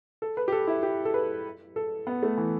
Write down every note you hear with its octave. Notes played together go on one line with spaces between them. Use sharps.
A4
B4
G4
A4
E4
G4
A4
B4
A4
B3
A3
E3